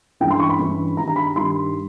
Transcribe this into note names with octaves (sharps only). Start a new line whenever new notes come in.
G2 E3 G#3 C#4 E4 G5
C6
C#6
B5
G2 E3 G#3 C#4 E4
G2 D#3 G3 A#5
A#5
B5
G2 D#3 G3 C6